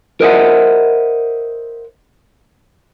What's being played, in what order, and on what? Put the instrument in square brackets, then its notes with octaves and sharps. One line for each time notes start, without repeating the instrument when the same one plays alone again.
[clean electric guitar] A#4 C5 D#5 E5 F#5